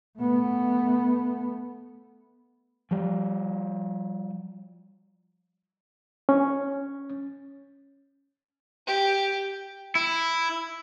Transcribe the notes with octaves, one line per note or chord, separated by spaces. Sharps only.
A3 B3
F3 G3
C#4
G4
E4